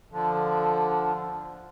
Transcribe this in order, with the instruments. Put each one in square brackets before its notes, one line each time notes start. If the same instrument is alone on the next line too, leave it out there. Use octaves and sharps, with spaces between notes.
[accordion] D3 F3